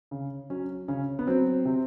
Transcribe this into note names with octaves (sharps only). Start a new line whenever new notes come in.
C#3
F#3 C#4
C#3 C#4
B3
F#3 C4
C3